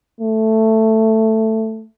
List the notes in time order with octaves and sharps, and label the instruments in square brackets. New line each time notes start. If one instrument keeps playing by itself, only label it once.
[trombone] A3